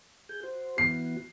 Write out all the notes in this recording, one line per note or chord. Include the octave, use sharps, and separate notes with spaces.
G#4 G6
F#4 C5
E3 B3 F#4 C7